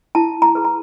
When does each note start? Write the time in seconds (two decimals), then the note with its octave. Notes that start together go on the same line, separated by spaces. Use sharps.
0.15 E4 A5
0.42 A#5
0.55 G#4 B4
0.65 A#5